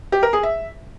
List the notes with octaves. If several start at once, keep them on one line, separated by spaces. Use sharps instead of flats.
G4
A#4
G#4
E5